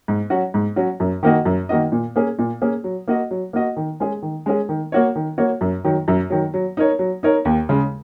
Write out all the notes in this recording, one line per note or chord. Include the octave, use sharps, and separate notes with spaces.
G#2
F#3 C#4 F#4
G#2
F#3 C#4 F#4
F#2
D#3 A#3 F#4 D#5
F#2
D#3 A#3 F#4 D#5
A#2
A#3 C#4 G#4
A#2
A#3 C#4 G#4
F#3
A#3 F#4 D#5
F#3
A#3 F#4 D#5
D#3
G#3 C#4 G#4
D#3
G#3 C#4 G#4
D#3
A#3 F#4 C#5
D#3
A#3 F#4 C#5
F#2
D#3 F#3
F#2
D#3 F#3
F#3
D#4 A#4 C#5
F#3
D#4 A#4 C#5
D#2
C#3 G#3